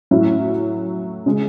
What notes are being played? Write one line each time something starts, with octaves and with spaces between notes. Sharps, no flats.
A2 F#3 C#4 E4
C#3 G#3 C#4 G#4